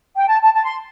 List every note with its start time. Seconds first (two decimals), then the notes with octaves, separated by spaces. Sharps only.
0.16 G5
0.29 A5
0.42 A5
0.54 A5
0.64 C6